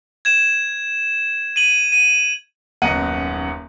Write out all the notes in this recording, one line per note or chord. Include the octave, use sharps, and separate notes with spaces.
G#6 E7
D#7 F#7
D#7
D#1 F#2 B3 D#5 F#5 D#7